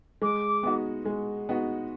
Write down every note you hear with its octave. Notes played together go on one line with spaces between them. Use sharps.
G#3 D6
B3 D#4 F#4
G#3
B3 D#4 F#4